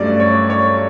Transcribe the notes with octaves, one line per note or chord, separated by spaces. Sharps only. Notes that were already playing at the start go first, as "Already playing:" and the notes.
Already playing: G2 F#3 A3 C#4 D5
C#5
C#5